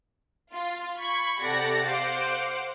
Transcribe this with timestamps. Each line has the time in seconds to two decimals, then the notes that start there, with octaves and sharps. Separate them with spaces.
0.51 F4
0.99 B5 C#6 G#6
1.41 C3 G4 A4 D5 F#5 A#6
1.86 C5 F5 F#5 D6